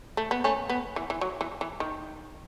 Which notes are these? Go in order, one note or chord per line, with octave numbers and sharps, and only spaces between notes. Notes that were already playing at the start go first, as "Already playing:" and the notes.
A3
B3
A3 C#4
B3
E3
E3
F#3
E3
E3
D#3